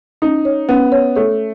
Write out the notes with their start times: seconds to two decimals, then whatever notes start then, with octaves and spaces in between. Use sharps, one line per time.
0.22 C#4 D#4
0.45 C#5
0.69 B3 C#4
0.92 C#5
1.16 A3 C#5